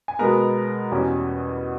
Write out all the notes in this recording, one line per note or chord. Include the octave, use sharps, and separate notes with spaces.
G#5
B2 G#3 B3 A#4 A#5
E2 B2 G3 C#4